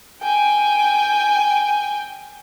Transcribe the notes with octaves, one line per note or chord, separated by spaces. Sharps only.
G5 G#5